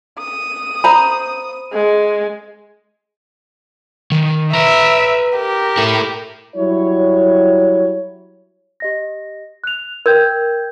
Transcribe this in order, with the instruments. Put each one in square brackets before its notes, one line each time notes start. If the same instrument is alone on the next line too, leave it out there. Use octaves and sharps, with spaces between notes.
[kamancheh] D#6
[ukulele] C5 A#5 B5
[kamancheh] G#3
[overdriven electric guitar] D#3
[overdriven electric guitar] B4 A#5 [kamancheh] E5
[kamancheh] G4 A#4
[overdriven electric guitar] E4 A4
[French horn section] F#3 G3 E4 C#5
[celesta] G4 D#5 A#6
F#6 F7
[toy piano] A#4 [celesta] G5 G6 G#6